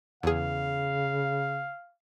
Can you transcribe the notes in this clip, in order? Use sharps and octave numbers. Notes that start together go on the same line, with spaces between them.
E2 C#3 G#4 F5